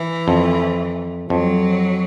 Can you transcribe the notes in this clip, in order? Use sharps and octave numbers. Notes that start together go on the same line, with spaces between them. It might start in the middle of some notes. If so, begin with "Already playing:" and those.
Already playing: E3
F2
F2 F#3